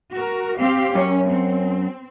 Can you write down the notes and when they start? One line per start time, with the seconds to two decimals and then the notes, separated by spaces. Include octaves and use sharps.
0.13 F#4 A#4
0.59 C4 G4 F5
0.95 F#2 C#4 C#5
1.31 C4